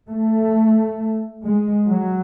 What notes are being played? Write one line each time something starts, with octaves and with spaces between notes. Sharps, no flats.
A3
G#3
F#3